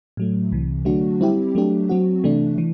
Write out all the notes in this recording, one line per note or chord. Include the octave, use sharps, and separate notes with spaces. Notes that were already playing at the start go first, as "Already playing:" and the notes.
A2 F#3 A3
C2 C3 E3
D3 F#3 A3 D4 F#4
G3 C4 E4 G4
F#3 A3 D4 G4
F#3 C4 F#4
C3 E3 A3 D4
E3